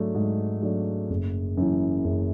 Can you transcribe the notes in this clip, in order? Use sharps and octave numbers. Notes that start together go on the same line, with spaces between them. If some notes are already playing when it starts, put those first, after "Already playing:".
Already playing: G#2 F#3 A3 D4
G#2
F#3 A3 D4
F#1
F#2 E3
F#1